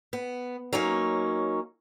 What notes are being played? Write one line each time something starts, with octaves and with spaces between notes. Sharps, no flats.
B3
F#3 A#3 C#4 D#4 C#5